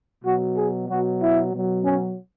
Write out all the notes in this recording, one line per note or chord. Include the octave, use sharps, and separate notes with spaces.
B2 F#3 F#4
G#4
B2 F#3 F#4
E4
B2 F#3
C#4